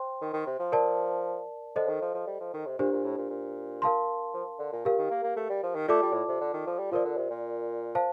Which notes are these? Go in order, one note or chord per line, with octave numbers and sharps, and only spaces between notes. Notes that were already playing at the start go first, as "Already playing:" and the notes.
Already playing: C5 G5 C6
D#3
D#3
C3
F3
A#4 D5 A5
D3 A4 C5 D#5
D#3
F3
F3
G3
F3
D#3
C3
A#2 D4 G4 C5
A#2
A2
A#2
A#2
A#4 F5 A5 C6
F3
D3
A#2
A#2 G4 A#4 F5
D#3
A#3
A#3
A3
G3
F3
D#3
A3 F4 A4 D5 A5 D6
G3
A2
C3
D3
D#3
F3
G3
F3 F4 A#4 D5
D3
C3
A#2
C5 F5 A5